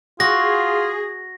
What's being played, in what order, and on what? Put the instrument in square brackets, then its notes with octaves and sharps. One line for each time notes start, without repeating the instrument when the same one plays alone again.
[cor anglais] F4 [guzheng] F#4 [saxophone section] G#4 [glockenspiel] A#6